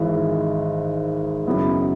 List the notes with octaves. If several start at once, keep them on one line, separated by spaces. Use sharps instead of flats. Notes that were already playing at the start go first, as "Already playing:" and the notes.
Already playing: G#1 G#2 E3 G#3
F#2 C#3 F#3 B3 E4